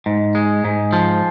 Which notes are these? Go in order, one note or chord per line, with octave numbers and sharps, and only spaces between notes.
G#2
G#3
G#2
F3